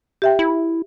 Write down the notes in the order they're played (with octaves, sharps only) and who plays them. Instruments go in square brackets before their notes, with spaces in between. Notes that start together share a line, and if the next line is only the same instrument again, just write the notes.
[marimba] G4 E5 G5
[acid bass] E4